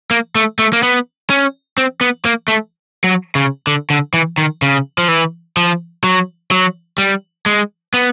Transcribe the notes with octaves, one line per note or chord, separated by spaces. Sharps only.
A#3
A3
A3
A#3
B3
C#4
C4
B3
A#3
A3
F#3
C#3
D3
D3
E3
D#3
C#3
F3
E3
F3
F#3
F#3
G3
G#3
B3